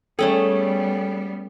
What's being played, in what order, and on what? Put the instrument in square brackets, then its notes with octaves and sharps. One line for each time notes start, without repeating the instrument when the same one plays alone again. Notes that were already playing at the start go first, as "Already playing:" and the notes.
[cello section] G3 B3 [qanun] A3 C#4 G#4 [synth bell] A4 G5